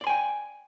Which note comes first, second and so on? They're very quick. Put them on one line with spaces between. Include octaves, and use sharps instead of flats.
D5 C6 G#5 G5